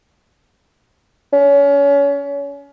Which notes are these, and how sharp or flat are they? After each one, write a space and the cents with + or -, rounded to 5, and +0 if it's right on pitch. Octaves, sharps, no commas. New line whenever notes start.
C#4 +30